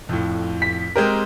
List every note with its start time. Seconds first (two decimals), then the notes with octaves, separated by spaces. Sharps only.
0.09 F2 A2
0.62 B6
0.96 G#3 C4 G4 A#4